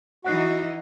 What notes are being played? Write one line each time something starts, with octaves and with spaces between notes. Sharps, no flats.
E3 D#4 F#4 F#5 F#6 C7